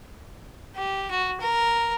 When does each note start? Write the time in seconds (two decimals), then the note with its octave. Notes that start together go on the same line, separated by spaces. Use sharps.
0.76 G4
1.11 F#4
1.41 A#4